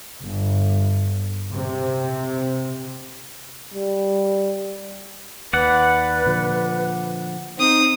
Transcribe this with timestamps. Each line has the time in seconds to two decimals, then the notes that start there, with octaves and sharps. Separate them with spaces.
0.22 G1
1.54 C3
3.74 G3
5.53 D#2 B4 D5 F#5
6.26 A#2 D3 F3
7.58 C4 D#4 D#6